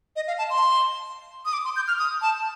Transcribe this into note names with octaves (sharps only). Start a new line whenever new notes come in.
D#5
F5
A5
C6
D#6
D6
C6
G6
F6
D#6
A5